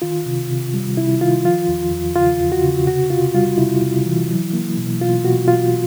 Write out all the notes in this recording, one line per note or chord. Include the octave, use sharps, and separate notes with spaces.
D#3 F4
C3
C3
G3
C3 E4
D#3 F4
F3 F4
E2
E2
C#3 F4
E2
F#4
C#3
C3 F#4
C3 F4
G3 F4
C3 E4
C3
E3
F#3
A#3
B2
B2 F4
B2 F#4
B2 F4